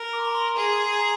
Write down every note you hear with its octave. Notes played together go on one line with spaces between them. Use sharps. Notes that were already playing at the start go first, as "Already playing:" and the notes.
Already playing: A#4
D6
C6
A#5
C6
G#4
A#5